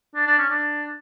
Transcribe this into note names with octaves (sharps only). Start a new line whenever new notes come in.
D4
D4
C#4
D4